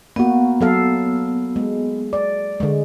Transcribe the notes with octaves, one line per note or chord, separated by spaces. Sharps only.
A#3 B3 F#4
F#3 A4 F5
G#3
D5
D3 G#3